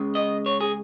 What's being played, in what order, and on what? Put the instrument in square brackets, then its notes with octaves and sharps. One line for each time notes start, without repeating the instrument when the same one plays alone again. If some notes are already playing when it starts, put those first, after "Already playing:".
Already playing: [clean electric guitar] C#2 C#3 G#3
D#5
C#5
G#4